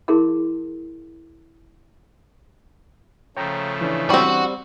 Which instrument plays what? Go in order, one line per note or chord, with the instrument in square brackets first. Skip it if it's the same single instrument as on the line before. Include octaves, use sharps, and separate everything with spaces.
[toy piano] E4 G#4 A#4 C6 D6
[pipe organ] C#3 F3 A3 [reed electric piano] C#5 G5 A#5
[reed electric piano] E3 C#4 D4
[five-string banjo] G3 C4 [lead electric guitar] F#4